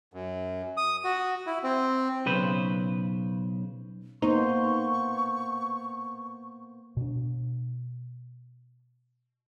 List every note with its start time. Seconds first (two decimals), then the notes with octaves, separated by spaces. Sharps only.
0.14 F#2
0.77 D#6
1.04 F#4
1.47 E4
1.63 C4
2.26 B1 C#3 B4 C5
4.22 A#3 B3 D#4 C5 C#6
6.97 B2 D4